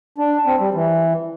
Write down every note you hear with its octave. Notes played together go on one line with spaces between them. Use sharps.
D4
C4
G3
E3